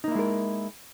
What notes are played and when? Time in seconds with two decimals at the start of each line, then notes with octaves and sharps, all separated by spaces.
0.04 D#4
0.08 A#3
0.11 E4
0.15 G#3
0.19 A#4